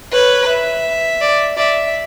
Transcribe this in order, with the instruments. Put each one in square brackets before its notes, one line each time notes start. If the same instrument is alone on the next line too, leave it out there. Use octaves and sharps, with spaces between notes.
[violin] B4 [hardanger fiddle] C#5
[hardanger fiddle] E5
[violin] D5
[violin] D5 [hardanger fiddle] E5